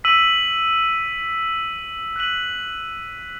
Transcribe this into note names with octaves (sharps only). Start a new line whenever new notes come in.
E6 B6 D#7 F#7
F#6 B6 D#7 F#7